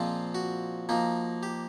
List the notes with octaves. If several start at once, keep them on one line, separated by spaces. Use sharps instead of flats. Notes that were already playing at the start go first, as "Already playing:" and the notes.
Already playing: A#2 F3 G#3 C4 F4
F#4
F3 A#3 D#4
G4